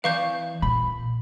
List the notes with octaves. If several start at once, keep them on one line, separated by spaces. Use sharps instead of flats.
E3 B4 D5 F5 C#6 G6
A#2 B5